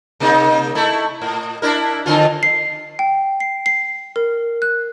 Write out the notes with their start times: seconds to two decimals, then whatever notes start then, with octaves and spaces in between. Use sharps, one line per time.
0.20 C3 A#3 D#4
0.75 A3 E4
1.22 A2
1.62 D4 E4 A#4
2.06 F2 D3 F4
2.43 C7
2.99 G5
3.40 C7
3.66 C7
4.16 A#4
4.62 F#6